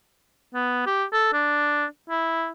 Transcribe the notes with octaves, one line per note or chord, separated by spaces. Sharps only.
B3
G4
A4
D4
E4